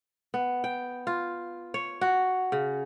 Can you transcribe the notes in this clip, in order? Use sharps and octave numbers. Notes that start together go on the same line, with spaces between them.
B3
G5
F4
C#5
F#4
C#3